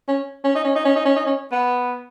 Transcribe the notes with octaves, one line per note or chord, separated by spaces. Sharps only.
C#4
C#4
D#4
C#4
D#4
C#4
D#4
C#4
D#4
C#4
B3